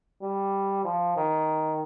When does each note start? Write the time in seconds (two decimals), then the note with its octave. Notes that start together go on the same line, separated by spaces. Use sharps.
0.22 G3
0.84 F3
1.17 D#3